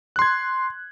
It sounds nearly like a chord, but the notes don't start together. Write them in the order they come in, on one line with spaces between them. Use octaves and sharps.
F#6 C6 G#6